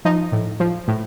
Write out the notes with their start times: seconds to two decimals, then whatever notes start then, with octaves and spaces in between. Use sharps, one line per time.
0.05 F3 D#4
0.32 A2
0.60 F3
0.88 A2